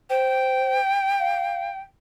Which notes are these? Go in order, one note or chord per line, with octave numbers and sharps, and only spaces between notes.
C5 G5
F5